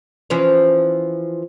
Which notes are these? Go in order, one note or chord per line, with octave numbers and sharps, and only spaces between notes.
E3 F3 C#4